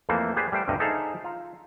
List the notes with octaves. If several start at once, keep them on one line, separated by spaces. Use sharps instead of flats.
F2 E3 A3 A#3 C5
G4 G#4 B4 C5 D5
G3 A3 C5 G5
D2 G2 C3 D#5
D#4 G#4 A4 C5 E5 F5
F4 A#5